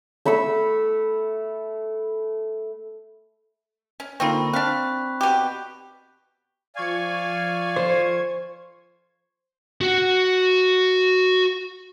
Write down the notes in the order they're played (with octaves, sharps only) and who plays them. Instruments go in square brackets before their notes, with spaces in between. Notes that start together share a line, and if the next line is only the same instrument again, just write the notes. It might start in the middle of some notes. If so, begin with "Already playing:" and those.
[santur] A3 B5 C#6 E6
[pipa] C#4
[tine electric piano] D3 A#3 [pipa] C4 D#4 F4 [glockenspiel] B5 C#6
[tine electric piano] C4 D5 [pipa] D4 F5 [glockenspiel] F#6 B6
[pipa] B2 G4
[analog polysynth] F3 C#6 G#6 [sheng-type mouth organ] D5 F5 G#5
[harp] C5
[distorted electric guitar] F#4 F#5